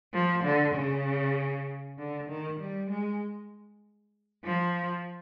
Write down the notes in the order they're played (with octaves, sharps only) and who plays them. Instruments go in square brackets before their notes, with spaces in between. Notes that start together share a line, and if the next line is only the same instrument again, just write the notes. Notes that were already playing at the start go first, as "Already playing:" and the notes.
[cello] F3
D3
C#3
D3
D#3
G3
G#3
F3